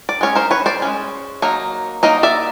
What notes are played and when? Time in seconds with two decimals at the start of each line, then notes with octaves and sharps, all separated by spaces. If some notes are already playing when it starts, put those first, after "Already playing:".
0.09 D5
0.21 G#3 C#4 C#5
0.35 A#4 C5
0.51 B4 C#5
0.66 C5 D5
0.82 G#3 C#4
1.42 F#3 A#3 D#4
2.03 F#3 A#3 D#4 D#5
2.23 D5 E5